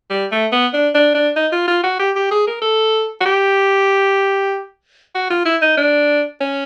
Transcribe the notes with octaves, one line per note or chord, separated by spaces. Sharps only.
G3
A3
B3
D4
D4
D4
D#4
F4
F4
F#4
G4
G4
G#4
A#4
A4
F#4
G4
F#4
F4
E4
D#4
D4
C#4